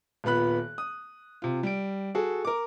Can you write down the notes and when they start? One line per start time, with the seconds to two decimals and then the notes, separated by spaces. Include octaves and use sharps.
0.24 D#1 A#2 B3 B5 F#6
0.78 D#6
1.42 C3 F4
1.63 G3 D7
2.15 F#4 G#4 A4
2.45 A#4 D6